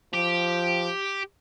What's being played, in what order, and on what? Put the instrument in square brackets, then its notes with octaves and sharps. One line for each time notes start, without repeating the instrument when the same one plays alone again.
[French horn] F3 [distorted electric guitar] G4